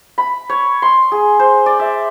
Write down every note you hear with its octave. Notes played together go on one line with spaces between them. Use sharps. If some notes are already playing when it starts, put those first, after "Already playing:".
B5
C#5
C6
G#4
C5
D5
E5